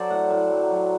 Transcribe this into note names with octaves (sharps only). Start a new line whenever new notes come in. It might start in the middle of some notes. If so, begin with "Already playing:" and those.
Already playing: F#3 A4 C5 D5
A2 F#5
A2
F#3
F#3